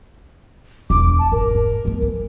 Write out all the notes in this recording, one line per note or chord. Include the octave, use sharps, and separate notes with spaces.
E1 D2 D6
A5
G#1 A#4
G#2
A3 B3
E3